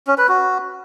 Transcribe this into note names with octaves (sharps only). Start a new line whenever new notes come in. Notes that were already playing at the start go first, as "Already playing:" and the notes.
C#4
B4
F#4